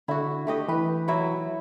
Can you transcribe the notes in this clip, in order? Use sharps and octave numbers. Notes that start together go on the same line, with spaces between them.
D3 E4 F#4
A3 G4 D#5
E3 G4 B4
F#3 E4